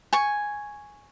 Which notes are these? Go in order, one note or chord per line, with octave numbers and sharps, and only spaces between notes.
G#5 C#6